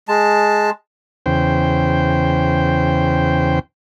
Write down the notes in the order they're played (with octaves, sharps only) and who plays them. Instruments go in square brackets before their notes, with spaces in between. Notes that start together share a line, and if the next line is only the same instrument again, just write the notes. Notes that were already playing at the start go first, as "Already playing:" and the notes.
[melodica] G#3 A5
[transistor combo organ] E2 C#3 C5 G5